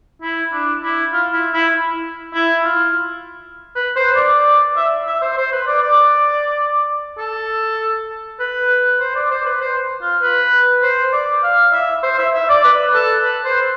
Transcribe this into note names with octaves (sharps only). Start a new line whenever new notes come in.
E4
D4
E4
F4
E4
E4
E4
F4
B4
C5
D5
E5
E5
C5
C5
B4
D5
D5
A4
B4
C5
D5
C5
B4
C5
F4
B4
C5
D5
F5
E5
C5
E5
E5
D5
B4
A4
B4
C5